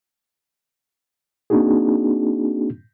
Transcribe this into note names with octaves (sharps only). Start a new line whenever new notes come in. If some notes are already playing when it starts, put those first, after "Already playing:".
A#3 C4 D4 D#4 F#4 G#4